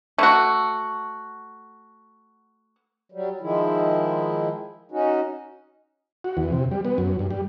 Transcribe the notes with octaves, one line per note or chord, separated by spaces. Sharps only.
A3 F#4
F#3 G3
D#3 F3 G#3 E4
C#4 D#4 F#4
F#4
E2
C3
G3
B3
F#2
G2
G3